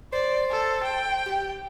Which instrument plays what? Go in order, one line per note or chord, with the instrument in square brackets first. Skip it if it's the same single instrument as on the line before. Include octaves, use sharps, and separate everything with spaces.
[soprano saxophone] C5 [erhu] D5
[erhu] A4
G5
[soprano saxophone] G4